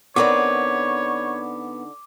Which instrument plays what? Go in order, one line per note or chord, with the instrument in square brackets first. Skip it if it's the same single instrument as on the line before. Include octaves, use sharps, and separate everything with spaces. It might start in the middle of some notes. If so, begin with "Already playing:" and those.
[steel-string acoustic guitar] D3 D#4 D5 [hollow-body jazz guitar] B3 C4 A#4 [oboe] C#5 [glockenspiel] D6